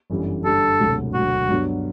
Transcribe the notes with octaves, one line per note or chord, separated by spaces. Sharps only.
G1 F#2 E3 G3
G2 D3 G3 A4
E1 D2 C3 F#3
E1 D2 D3 F#3 F#4
G2 F#3 B3 D4